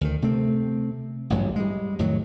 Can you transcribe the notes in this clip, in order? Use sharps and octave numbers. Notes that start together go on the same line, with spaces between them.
D2 D#3
C3 A3 C4
A1 D2 G2 F#3
G3 G#3
F2 A2 D#3 F#3